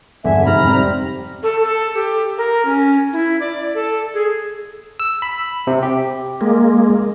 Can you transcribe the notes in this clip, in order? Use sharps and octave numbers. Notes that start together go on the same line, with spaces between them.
E2 G2 D3 E5 G#5
F2 G#2 C3 A#5 B5 F6
G3 C4
A4
A4
G4
A#4
C#4
E4
D5
A4
G#4
E6
B5
C3
G4
G#3 A#3